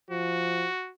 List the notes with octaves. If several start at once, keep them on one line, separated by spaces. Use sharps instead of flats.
F3 F#4